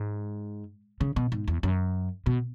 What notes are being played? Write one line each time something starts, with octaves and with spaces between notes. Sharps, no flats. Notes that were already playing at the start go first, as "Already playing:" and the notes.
Already playing: G#2
C#3
B2
G#2
E2
F#2
B2